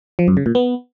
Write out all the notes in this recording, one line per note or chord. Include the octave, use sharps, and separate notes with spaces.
F3
F#2
C#3
A#2
B3